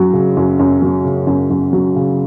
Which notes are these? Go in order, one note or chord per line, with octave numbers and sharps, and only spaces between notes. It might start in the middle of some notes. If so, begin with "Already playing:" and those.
Already playing: F#2 F#3
C#3
F#2
F#2
F#3
C#3
F#2
F#2
F#3
C#3